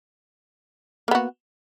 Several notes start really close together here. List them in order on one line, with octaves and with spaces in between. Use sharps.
A#3 B3 F#4